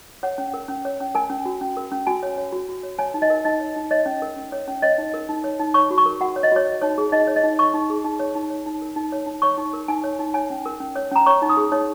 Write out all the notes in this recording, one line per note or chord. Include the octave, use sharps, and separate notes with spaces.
C#5 F#5
C#4
A#4
C#4
C#5
C#4
A#4 G#5
C#4
F#4
C#4
A#4
C#4
F#4 G#5
C#5
C#5
F#4
F#4
C#5
C#5 G#5
D#4
D#5
A#4
D#4 D#5
C#5
D#4
C#5 D#5
C#4
A#4
C#4
C#5
C#4
C#5 D#5
D#4
A#4
D#4
C#5
D#4
C#5 C#6
F#4
C#6
A#4
F#4 F#5
C#5
D#5
F#4 C#5
C#5
D#4 C#5
G#4
D#4 D#5
C#5
D#5
D#4
C#5 C#6
D#4
G#4
D#4
C#5
D#4
C#5
D#4
A#4
D#4
C#5
D#4
C#5 C#6
D#4
A#4
D#4 G#5
C#5
D#4
C#5 G#5
C#4
A#4
C#4
C#5
C#4 A#5
C#5 C#6
D#4
D#6
G#4
D#4 C#5